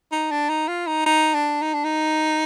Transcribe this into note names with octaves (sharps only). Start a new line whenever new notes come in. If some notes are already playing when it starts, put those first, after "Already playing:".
D#4
D4
D#4
F4
D#4
D#4
D4
D#4
D4
D#4